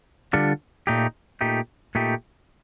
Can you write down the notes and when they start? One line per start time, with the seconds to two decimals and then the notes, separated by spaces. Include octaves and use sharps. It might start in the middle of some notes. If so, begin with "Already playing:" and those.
0.33 D3 G3 D4 F4 A4
0.87 A#2 A3 D#4 G4
1.41 A#2 A3 D#4 G4
1.95 A#2 A3 D#4 G4